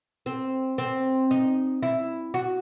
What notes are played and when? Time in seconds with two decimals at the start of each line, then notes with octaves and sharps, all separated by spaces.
0.26 C4
0.78 C4
1.31 D#4
1.82 E4
2.34 F#4